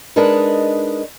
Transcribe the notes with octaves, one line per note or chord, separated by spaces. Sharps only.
G#3 D4 D#4 A#4 B4